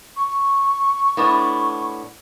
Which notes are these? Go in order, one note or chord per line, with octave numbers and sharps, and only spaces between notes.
C#6
A2 B3 D4